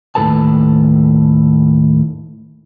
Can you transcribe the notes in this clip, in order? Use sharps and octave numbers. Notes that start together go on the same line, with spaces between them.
D#2 A2 F#3 A4 B4 A5